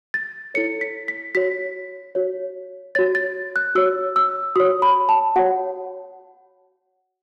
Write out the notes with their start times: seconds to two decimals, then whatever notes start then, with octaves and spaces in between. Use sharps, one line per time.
0.14 A6
0.54 E4 A4 C#5 C#7
0.81 B6
1.08 B6
1.35 F#4 C#5 B6
2.15 F#4 C#5
2.95 F#4 C#5 A6
3.15 A6
3.56 F#6
3.75 F#4 C#5 E6
4.16 E6
4.56 F#4 C#5 D#6
4.82 B5
5.09 A5
5.36 F#4 C#5 F#5